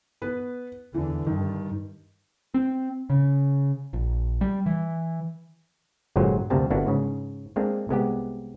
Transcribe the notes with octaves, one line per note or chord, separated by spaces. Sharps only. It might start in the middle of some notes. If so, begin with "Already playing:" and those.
B3 B4
E2 D3 E3
G2 D#3
C4
C#3
A#1
G3
E3
G1 G2 A#2 F#3 G#3 C5
D2 G2 C3 A#3 C4 A5
G1 A#3 B3 D4 E4 F#4
G#2 C#3
G#3 A#3 C4 D4
C2 G#3 B3 G4